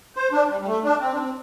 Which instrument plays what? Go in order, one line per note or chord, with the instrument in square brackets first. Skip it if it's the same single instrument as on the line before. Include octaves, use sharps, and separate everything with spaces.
[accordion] C5
D4
G3
G3
A3
D4
C4
D4
C4